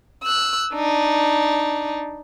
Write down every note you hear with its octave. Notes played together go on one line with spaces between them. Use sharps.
E6 F#6
D4 D#4